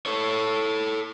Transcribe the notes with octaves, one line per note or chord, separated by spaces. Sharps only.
A4 C#5